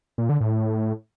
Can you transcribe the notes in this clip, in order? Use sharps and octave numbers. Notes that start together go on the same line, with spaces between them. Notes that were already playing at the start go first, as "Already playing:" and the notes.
A#2
D3
A2